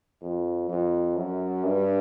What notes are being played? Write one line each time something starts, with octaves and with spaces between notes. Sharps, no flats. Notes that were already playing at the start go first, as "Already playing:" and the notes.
F2
F2
F#2
G2